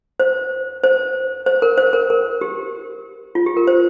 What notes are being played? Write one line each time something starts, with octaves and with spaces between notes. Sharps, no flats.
C5
C5
C5
A#4
C5
A#4
A#4
G4
F4
G4
A#4
C5